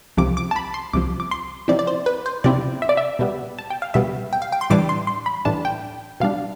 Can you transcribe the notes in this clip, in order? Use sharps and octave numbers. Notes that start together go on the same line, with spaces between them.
C2 C3 F3 D6
D6
A5
B5
C6
C2 C3 F3 D6
D6
C6
C3 F3 C4 E4 D5
D5
C5
B4
C5
C3 F3 C4 E4 D5
E5
D5
E5
B2 G3 B3
A5
G5
F5
B2 G3 B3 E5
G5
F5
G5
C6
A2 E3 G3 D4 D6
C6
C6
B5
A2 E3 G3 D4 A5
G5
B2 G3 D4 F5